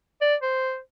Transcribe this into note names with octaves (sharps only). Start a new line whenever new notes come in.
D5
C5